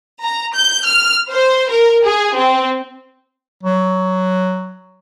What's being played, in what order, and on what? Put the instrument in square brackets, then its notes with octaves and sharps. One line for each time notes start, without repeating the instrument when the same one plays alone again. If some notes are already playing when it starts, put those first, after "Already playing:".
[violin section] A#5
G6
F6
C5
A#4
G#4
C4
[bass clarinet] F#3